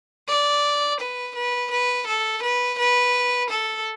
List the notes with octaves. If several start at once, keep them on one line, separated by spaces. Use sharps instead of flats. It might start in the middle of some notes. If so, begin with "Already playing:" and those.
D5
B4
B4
B4
A4
B4
B4
A4